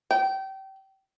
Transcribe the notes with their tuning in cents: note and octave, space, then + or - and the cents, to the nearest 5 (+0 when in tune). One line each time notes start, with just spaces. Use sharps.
G5 -25